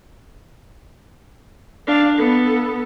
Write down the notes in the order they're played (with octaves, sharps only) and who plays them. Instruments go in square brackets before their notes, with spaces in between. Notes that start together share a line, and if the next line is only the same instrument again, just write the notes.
[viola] D4 F5
B3 A4